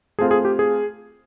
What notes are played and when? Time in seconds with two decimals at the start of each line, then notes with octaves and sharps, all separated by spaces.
0.19 A3 C4 F4 G#4
0.31 G#4
0.45 G4
0.59 G#4